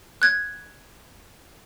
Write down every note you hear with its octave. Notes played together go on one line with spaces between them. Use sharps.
F#6 G#6